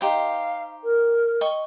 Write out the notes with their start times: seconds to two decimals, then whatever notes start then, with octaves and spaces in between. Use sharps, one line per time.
0.01 D#4 G4 C5 F5
0.84 A#4
1.41 D#5 G5 C#6